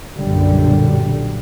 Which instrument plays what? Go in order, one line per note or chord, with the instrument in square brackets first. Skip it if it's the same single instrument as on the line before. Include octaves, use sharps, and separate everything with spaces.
[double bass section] B1 F#2 A#2 D3 G3